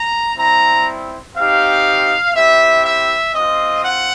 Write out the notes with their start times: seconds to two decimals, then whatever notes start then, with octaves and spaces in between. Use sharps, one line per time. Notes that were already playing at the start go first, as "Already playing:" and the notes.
Already playing: A#5
0.37 G3 C4 E4 A#5
1.36 C4 D#4 G4 F5
2.35 C4 E4 G4 E5
2.85 E5
3.34 C4 F4 D#5
3.84 F#5